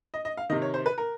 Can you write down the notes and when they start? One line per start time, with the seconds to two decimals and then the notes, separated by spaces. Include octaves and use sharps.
0.14 D#5
0.25 D#5
0.37 F5
0.50 D#3 D#5
0.52 C3
0.62 C#5
0.74 C5
0.86 B4
0.98 A#4